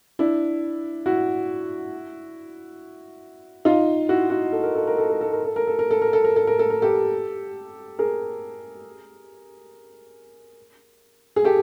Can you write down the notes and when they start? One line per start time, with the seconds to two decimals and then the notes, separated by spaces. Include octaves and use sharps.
0.19 D4 E4
1.06 E4 F#4
3.65 D#4 F4
4.09 E4 F#4
4.30 E4 F#4
4.52 A4
4.63 A#4
4.75 A4
4.87 A#4
4.98 A4
5.10 A#4
5.21 A4
5.33 A#4
5.45 A4
5.56 A#4
5.67 A4
5.79 A#4
5.91 A4
6.02 A#4
6.13 A4
6.24 A#4
6.36 A4
6.47 A#4
6.59 A4
6.70 A#4
6.82 G4 A4
7.99 G#4 A#4
11.36 G#4
11.44 G4 A4